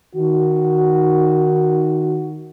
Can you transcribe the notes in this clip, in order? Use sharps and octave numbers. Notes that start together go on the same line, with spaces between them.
D#3 F#4